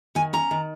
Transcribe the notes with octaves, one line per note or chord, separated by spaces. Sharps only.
D#3 G#5
C#4 A#5
D#3